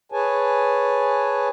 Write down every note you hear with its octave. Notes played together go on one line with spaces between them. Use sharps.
G#4 B4 C#5 G#5 A5